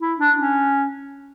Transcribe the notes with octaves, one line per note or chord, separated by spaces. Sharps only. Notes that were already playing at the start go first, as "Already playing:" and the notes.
E4
D4
C#4